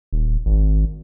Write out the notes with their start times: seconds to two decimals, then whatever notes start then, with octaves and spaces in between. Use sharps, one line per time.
0.12 D#1
0.46 G#1